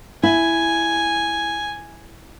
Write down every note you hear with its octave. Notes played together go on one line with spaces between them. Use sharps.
E4 G#5